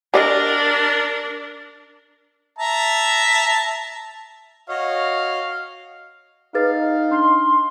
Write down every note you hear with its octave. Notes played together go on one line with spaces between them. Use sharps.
D4 G4 A#4 D5 D#5
E5 A5 A#5
F#4 C#5 D#5 F5
D#4 G#4 B4 F5 A6
D4 C6